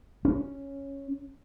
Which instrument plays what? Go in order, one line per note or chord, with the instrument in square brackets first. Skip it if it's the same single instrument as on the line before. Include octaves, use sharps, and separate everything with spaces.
[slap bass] C#4